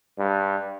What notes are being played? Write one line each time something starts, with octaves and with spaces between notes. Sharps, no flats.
G2